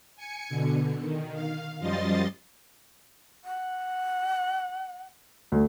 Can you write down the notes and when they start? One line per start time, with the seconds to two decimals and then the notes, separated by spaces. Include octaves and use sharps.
0.16 G#5 C#7
0.49 B2 D3
1.00 D#3
1.33 F5
1.79 F#2 F3 G3 D#5 C6 A6
3.45 F#5
5.52 D2